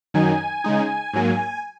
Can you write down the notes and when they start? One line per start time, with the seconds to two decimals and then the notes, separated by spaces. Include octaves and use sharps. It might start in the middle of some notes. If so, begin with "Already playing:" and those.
0.14 F#2 D#3 F#3 D#4 G#5
0.64 C#3 G#3 D#4
1.13 G#2 F#3 A#3